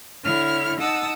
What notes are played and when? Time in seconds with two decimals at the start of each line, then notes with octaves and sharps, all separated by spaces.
0.24 D3 E4 C#5 F6
0.80 D#4 F#5 A5 D#6 E6